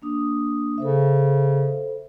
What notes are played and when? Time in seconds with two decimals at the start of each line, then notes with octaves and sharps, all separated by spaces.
0.02 A#3 D4 D#6
0.78 C#3 A4 C5 E5